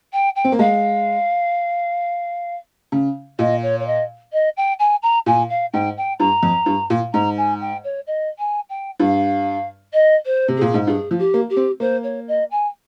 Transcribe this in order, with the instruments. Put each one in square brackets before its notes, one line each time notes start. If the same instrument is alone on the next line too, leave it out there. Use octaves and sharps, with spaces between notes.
[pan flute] G5
G5
[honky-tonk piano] C4
A#3
[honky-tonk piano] G#3 [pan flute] F5
[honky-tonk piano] C#3
[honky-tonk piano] A#2 [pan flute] D#5
[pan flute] C#5
C#5
D#5
D#5
G5
G#5
A#5
[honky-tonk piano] A#2 [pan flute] G#5
[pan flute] F5
[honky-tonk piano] G#2 [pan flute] G5
[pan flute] G5
[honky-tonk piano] G2 [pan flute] A#5
[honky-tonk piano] F2
G2
A#2
[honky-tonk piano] G#2 [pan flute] A#5
[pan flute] G#5
G5
C#5
D#5
G#5
G5
[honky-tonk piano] G2 [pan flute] F5
[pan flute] D#5
C5
[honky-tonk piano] C3
[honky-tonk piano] A#2 [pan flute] G#4
[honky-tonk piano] G#2
[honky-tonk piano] G2 [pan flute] G#4
[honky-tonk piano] F3
[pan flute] G4
[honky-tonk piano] A#3
[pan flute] G4
[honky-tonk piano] C4
[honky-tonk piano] A#3 [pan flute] C5
[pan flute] C#5
D#5
G#5